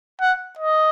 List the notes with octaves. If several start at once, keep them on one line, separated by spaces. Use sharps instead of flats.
F#5
D#5